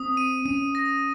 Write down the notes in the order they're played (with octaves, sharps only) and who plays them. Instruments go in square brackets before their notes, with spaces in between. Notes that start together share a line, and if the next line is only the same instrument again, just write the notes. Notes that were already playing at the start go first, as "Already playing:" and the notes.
Already playing: [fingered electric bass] C4 [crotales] D#6
[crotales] D#7
[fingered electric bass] C#4 [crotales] D#7
[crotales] A#6